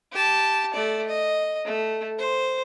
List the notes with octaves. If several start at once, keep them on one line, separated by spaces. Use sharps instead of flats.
G4 A5
A3 D5
D#5
A3
C5